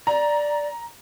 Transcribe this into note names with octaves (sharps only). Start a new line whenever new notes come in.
D5 A#5